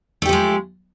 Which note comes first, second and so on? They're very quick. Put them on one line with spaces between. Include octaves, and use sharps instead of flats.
A3 G4 F3 G#3